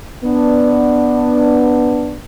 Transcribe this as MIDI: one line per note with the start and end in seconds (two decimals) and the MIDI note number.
0.24 2.17 59
0.24 2.17 62